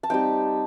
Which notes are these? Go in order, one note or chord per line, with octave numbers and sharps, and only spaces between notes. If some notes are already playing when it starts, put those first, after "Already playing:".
A5
G3 C4 D#4 G5